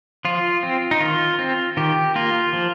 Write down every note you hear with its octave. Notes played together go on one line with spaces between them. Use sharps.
F3 F4
C4
D#4
D#3 F4
C4
D#3 G4
A#3 F4
F3